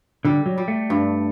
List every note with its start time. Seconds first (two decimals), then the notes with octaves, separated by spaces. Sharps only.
0.25 D3 G3
0.46 F#3
0.58 G3
0.68 A3
0.90 G2